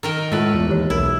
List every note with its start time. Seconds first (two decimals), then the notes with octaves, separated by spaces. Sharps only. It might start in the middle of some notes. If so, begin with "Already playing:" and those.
0.03 D#3 A#4 G5
0.32 A2 G#3 A3 F4 B4
0.54 E2
0.68 D#2 E3 G4 C#5
0.90 B1 E4 A#4